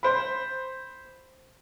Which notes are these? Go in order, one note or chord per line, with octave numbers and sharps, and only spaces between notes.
C5 B5